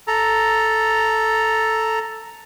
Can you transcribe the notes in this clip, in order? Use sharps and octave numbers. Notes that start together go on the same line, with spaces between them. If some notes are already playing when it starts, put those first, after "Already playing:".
A4 A#5